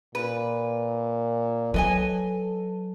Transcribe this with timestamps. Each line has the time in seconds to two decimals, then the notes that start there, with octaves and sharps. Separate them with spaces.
0.15 A#2 B4
1.74 F#3 A4 B4 D#5 G#5